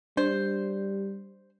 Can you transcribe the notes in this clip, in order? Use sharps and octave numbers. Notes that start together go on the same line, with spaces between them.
G3 D4 C5